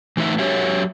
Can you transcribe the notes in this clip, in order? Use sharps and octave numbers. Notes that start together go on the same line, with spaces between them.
E3 A3 D#4 B4 E5
F#3 G4 C#5 E5